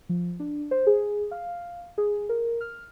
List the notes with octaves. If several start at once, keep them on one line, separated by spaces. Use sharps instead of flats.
F3
D4
C5
G#4
F5
G#4
A#4
F6